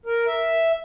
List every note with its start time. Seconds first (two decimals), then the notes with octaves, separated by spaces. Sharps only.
0.06 A#4
0.27 E5